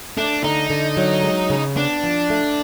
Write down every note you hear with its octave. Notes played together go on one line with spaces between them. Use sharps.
A3 D4
D3 D#4
D3
F#3
G#3
C#3
B3 D4
F3
A3